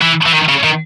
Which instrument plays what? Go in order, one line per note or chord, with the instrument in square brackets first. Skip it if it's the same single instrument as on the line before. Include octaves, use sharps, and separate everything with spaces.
[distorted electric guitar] E3
E3
D#3
C#3
D#3